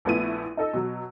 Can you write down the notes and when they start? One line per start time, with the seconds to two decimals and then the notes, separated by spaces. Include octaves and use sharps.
0.05 A#1 A3 B3 E4 D#7
0.57 D#4 A4 D#5 E6
0.73 B2 F#3